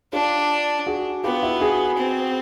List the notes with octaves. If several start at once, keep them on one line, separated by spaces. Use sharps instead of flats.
D4 F4 G4
F#4 G#4
B3 F4 G4
E4 F#4
F#4 G#4
C4